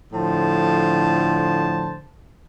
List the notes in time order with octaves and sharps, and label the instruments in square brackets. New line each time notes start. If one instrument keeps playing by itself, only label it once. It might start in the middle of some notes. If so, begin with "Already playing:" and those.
[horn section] A2 D3 F3 C5 A5